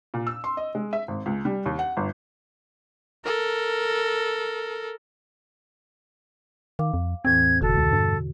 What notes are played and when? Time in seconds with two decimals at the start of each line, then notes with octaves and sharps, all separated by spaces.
0.14 A#2
0.27 E6
0.44 C6
0.57 D#5
0.75 G#3
0.93 E5
1.08 G#1
1.26 C#2
1.45 G3
1.66 D#2
1.79 F#5
1.97 G1
3.24 A4 A#4
6.79 D#3 F5 D6
6.94 F2
7.25 E2 A2 E3 C4 G#6
7.62 F1 B2 D3 F#4 A4
7.77 C#2
7.93 G2